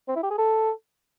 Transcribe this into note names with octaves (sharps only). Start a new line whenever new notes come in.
C4
E4
G4
G#4
A4